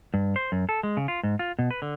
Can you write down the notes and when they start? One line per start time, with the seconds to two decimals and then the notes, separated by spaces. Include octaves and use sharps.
0.14 G2
0.36 C5
0.52 F#2
0.69 A4
0.83 G#3
0.97 C#3
1.08 F4
1.23 G#2
1.39 F4
1.59 B2
1.71 B4
1.82 D3